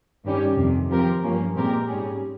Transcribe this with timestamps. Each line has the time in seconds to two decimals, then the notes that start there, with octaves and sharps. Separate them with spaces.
0.24 G2 D#3 G3 C#4 G4
0.56 F2 C3 D#3
0.89 F3 C4 G4 A#4
1.23 G2 F3 A#3 C#4
1.55 A#2 G#3 C4 G4 A#4
1.88 G#2 G3 C#4 G#4